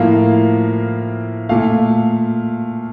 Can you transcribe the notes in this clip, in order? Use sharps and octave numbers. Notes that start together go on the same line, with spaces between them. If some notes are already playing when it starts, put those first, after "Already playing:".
Already playing: A2 F3 A#3 F5
A#2 A3 F5